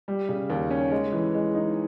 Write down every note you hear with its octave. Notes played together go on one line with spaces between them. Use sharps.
G3
C#3
D#2
C#4
G#3
E3
G#3
D#4